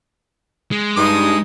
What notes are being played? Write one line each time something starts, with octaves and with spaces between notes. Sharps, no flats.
G#3
G2 D#4 D#6